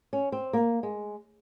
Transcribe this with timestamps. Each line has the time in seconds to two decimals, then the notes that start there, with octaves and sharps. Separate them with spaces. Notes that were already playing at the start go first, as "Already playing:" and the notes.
0.13 C#4
0.32 C4
0.53 A#3
0.83 G#3